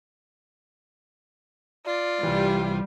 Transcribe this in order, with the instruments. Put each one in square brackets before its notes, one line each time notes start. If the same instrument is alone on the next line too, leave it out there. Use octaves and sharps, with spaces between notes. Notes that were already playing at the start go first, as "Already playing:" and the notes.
[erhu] F4 [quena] D5
[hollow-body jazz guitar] C2 E3 [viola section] G3